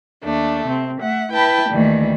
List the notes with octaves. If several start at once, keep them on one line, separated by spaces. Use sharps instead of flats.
D#2 A3 D4
C3 C4
A3 E5 F#5
E4 B4 G5 A5 B5
D2 D#3 E3 G3 A3 A#3